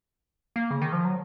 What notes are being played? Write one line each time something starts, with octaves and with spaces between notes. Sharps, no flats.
A#3
C#3
D#3
F3
F#3